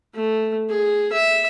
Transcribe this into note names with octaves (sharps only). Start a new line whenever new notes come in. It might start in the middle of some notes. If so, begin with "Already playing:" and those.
A3
G#4
E5